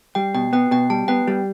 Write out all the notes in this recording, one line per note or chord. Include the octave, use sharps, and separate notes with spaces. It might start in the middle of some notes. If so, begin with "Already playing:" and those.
G3 G5
B2 G5
B3 G5
B2 G5
G3 A5
B3 G5
G3